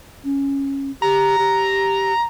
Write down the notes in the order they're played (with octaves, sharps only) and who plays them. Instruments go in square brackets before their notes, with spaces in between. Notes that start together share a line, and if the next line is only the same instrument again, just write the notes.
[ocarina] C#4
[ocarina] G4 [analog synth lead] A#5
[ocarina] G4